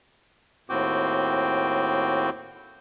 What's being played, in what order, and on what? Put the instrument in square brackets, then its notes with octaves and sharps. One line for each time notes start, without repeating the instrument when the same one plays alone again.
[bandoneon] D#2 A2 C4 F#4 G5 D6